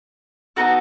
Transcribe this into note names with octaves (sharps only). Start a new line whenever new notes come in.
B3 D#4 F#4 A4